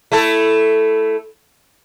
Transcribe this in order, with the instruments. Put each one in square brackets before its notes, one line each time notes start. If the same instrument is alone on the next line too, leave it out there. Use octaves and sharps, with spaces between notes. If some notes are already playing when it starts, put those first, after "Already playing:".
[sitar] A3 E4 A4